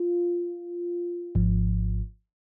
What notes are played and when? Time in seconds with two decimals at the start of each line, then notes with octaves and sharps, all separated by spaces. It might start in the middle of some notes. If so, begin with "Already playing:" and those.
Already playing: F4
1.35 G#1 G#2 F3